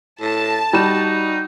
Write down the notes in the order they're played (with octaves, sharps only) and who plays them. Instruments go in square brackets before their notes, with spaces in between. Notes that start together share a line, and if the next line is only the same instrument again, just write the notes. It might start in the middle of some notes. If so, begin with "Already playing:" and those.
[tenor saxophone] A2 [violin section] A5
[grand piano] G3 E7 [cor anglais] D#4 [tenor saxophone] F#4